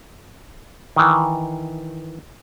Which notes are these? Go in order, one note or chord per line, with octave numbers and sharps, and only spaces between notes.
D#3 E3